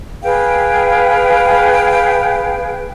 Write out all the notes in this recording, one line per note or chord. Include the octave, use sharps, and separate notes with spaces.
G#4 B4 F5 G5